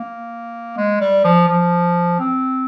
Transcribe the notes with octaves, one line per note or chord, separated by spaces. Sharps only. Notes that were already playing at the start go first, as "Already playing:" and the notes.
Already playing: A#3
G#3
G3
F3
F3
C4